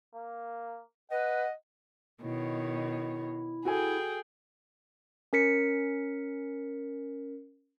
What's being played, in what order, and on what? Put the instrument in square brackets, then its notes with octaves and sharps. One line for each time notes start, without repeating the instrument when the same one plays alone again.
[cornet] A#3
[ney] B4 [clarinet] D#5 [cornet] F#5
[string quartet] B2 D#3 C#5 [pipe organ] E4
[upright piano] F#4 A4 G#5 [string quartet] G#4 G5
[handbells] C#4 A#4 B6 C#7